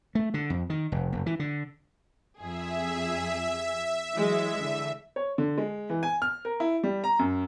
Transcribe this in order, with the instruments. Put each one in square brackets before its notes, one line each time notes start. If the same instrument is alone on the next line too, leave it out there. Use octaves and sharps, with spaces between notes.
[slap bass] A3
D3
F2
D#3
F1
F#1
E3
D3
[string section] F2 G#4 [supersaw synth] E5
[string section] E3 F#3 G#3
D3 E3
[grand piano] C#5
D3
G#3
E3
G#5
F6
A#4
E4
G3
A#5
F#2